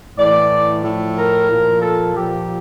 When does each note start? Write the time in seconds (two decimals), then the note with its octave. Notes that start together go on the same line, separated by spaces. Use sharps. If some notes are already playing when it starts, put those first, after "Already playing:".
0.19 A2 E3 D5
0.84 A2 F3
1.17 A#4
1.50 A#2 F3
1.82 A4
2.15 A#2 F3 G4